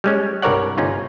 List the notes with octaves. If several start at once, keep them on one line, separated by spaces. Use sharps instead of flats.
G3 G#3 C#4
C2 G2 A#4 C#5 D5 F#5
G1 C#4 D#4 F4